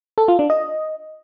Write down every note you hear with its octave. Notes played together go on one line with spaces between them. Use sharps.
A4
F4
D4
D#5